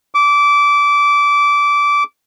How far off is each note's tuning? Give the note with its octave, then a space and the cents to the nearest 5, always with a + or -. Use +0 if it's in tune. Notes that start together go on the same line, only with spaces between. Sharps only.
D6 -20